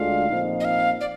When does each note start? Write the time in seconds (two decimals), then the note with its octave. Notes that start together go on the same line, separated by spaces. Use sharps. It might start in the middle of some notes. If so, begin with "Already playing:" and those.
Already playing: D2 D3 G#3 D4 F4 F5
0.28 A#2 F3 C4 D#4
0.60 D#5
0.65 F5
1.01 D5